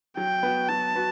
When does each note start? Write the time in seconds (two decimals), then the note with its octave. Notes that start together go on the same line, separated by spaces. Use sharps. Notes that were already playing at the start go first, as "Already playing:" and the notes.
0.17 F#3 G5
0.43 B3 F#4
0.69 F#3 A5
0.95 B3 F#4